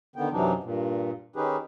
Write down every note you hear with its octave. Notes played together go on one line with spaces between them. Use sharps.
D3 D#3 B3 G5
F#2 C3 E3 F#3 D4 D#4
G2 A#2
D#3 C#4 D#4 G4 G#4 B4